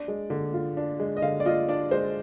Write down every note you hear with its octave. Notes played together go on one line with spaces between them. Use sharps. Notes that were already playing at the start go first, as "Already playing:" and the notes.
Already playing: D4 D5
G#3
D3
F4
D4
G#3
D#5
D3 F5
D5
F4 D#5
D4 D5
G#3 C5